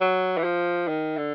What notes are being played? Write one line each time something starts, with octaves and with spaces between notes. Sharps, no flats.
F#3
E3
F3
D#3
D3